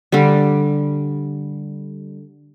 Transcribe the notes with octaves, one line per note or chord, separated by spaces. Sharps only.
D3 G3